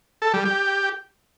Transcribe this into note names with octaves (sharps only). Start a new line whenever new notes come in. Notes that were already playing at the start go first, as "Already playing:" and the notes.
A4
G3
G4